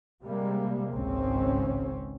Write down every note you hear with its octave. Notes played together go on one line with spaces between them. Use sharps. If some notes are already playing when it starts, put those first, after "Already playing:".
C3 G3 G#3 A#3
G#1 C#2 G#2 C4 C#4